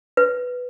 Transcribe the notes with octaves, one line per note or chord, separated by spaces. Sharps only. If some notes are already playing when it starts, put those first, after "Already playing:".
B4